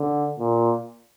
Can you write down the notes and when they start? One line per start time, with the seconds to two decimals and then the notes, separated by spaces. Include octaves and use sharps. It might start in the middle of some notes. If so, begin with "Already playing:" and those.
Already playing: D3
0.39 A#2